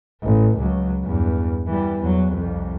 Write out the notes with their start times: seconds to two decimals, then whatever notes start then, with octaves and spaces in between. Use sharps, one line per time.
0.23 A1
0.58 C#2 F#3
1.04 E2 G2
1.67 E3 G3
2.00 E2 F#3
2.33 C2 F2